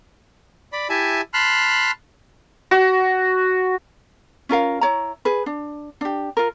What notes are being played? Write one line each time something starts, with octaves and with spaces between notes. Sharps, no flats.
D5 B5
E4 G4 E5 G#5 A5
A5 B5 C6 F6 F#6
F#4
C#4 F4 A#4 F5
E4 C#5 A#5
G#4 B4
D4
D4 G4
F4 A#4